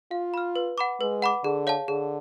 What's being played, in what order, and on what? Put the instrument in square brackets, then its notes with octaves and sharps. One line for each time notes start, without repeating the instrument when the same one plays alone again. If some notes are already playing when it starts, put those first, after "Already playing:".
[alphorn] F4 [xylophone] F5
[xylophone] B5 F6
B4
F#5 B5 D6
[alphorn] G#3 [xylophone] B4
[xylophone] F#5 B5 D6
[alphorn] D3 [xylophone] G#4
[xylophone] C#5 F5 A5
[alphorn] D3 [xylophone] G#4